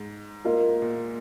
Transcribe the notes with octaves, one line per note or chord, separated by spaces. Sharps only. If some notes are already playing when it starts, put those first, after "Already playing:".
Already playing: G#2
A#3 F4 A#4 D#5
A#2